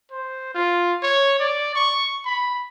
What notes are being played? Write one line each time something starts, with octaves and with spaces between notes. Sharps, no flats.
C5
F4
C#5
D5
C#6
B5